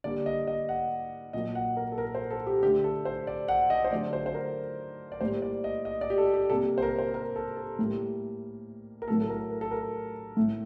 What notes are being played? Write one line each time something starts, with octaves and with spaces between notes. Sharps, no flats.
D3 G3 A#3 D5
D#5
D#5
F#5
A#2 F#3 A#3 D#5
F#5
A#4
A4
A#4
C5
A4
G4
D3 A3 G4
A4
C5
D5
F#5
D#5
C5
D3 F#3 A3 D5
C5
C5
A#4
D5
A2 G3 A#3 C5
D5
D#5
D#5
D5
G4
A4
G4
C3 G3 A#3 A4
C5
A#4
C5
A#4
A4
A4
A2 G3 A#3
A#4
A2 F#3 A3 A4
A4
A#4
A#4
A4
A#4
A2 A3